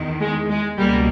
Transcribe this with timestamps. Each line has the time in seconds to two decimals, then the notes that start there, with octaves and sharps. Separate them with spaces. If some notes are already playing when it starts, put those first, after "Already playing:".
Already playing: E2 D#3
0.20 G#3
0.49 G#3
0.78 C#2 B2 G3 A#3